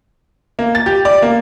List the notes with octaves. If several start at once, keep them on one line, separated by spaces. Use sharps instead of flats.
A#3
A6
G4
D5
A#3